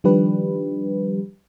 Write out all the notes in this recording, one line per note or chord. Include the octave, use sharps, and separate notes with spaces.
D#3 F3 G3 D4 G4 B4